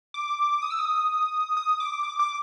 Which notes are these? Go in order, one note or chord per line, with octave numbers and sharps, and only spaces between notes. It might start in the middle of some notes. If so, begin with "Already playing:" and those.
D6
D#6
E6
D#6
D#6
D6
D6
D6